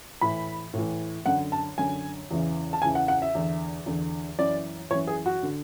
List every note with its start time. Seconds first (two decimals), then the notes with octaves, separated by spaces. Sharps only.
0.21 A2 E3 B5
0.74 A2 E3
1.26 F#2 D3 F#5
1.52 A5
1.78 F#2 D3 G#5
2.31 E2 C#3 E3
2.73 A5
2.82 E2 C#3 E3 G#5
2.95 F#5
3.08 F#5
3.22 E5
3.35 E2 D3
3.86 E2 D3
4.39 F#2 E3 D5
4.91 F#2 E3 C#5
5.07 G#4
5.26 F#4
5.43 D3